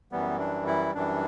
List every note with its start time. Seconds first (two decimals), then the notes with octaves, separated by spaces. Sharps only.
0.12 F#2 E3 G3 B3
0.39 D4
0.66 E4
0.94 F#2 E3 G3 D4